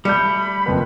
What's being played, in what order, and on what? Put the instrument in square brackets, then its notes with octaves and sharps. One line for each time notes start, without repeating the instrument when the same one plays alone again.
[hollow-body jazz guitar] G3 A3 [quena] B5 [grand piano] G6 C#7
[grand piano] F#1 F2 B4